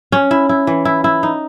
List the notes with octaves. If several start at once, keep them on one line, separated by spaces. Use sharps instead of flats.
C#4
E4
E4
E3
E4
E4
D#4